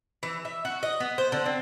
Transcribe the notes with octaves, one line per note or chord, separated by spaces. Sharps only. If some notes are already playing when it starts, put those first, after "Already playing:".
E3
E5
F#4
D#5
B3
C5
D3
C4